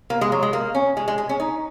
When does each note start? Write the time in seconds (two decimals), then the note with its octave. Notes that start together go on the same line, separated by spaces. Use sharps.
0.10 A#3
0.21 G#3
0.32 F#3
0.43 G#3
0.53 A#3
0.75 C#4
0.97 G#3
1.08 G#3
1.18 G#3
1.29 C#4
1.40 D#4